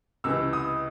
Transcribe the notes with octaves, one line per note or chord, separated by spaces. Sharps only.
C#2 C3 E3 E6
D#6